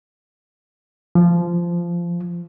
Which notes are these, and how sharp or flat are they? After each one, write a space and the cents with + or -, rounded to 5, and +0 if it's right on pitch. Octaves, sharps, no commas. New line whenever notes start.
F3 -15